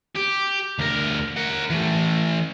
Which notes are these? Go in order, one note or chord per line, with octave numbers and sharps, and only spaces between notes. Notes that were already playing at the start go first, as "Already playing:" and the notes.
G4
D2 A#4
A#4 F#5
E3 A3